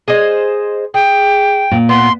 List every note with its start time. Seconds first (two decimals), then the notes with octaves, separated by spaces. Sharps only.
0.08 G#4 C5 D#5
0.94 G#4 G5
1.71 A#2
1.89 B3 C6